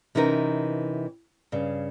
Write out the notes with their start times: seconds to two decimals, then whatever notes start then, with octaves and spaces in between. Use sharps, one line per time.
0.15 C3 E3 C#4 D#4 A#4
1.52 G2 C#3